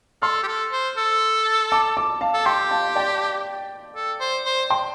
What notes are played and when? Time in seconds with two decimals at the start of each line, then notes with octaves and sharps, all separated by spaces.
0.22 A4 C6 F6
0.43 G4
0.47 A4
0.72 C5
0.97 A4
1.72 A5 D6
1.97 A5 D6
2.21 F5 A5
2.34 A4
2.46 G4 G5 C6
2.71 F5 A5
2.96 D5 G5
3.96 A4
4.20 C5
4.45 C5
4.70 G5 C6